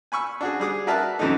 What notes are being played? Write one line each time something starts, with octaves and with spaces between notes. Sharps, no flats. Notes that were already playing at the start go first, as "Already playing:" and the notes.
G#5 B5 C#6 E6
D4 F#4 G#4
G3 G#4 D6 D#6
F#4 A#4 B4 D5 E5 A5
F#2 C3 E3 F#3 A3 D#4